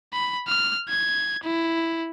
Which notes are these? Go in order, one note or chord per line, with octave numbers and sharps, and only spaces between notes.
B5
F6
G#6
E4